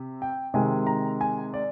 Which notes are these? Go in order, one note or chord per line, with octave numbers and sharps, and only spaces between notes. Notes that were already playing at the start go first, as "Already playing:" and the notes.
Already playing: C3
G5
C3 D#3 G#3 G#5
A#5
G#5
D5